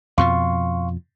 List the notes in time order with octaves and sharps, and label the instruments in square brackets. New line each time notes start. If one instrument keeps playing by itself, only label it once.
[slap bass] F2 B2 F3 [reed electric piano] F5 C6 C#6